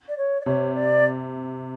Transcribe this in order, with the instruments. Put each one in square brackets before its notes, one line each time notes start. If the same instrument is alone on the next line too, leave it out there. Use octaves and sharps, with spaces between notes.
[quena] D5
C#5
D5
[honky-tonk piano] C3 [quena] C#5
[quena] D5